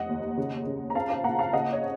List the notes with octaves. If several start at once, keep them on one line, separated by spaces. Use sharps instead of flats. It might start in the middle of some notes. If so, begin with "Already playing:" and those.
Already playing: F1 D#5 F#5
D#2
C#3
C#3
A#5
C4 F5 A5
F5 A5
A#2 F#5 A#5
F5 A5
C#3 D#5 F#5
C#5